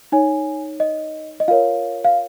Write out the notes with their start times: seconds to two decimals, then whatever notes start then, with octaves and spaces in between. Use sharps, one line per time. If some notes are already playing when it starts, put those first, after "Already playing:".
0.12 D#4 C#5 G#5
0.80 D#5
1.40 D#5
1.48 F4 A#4 C#5 F5
2.05 F5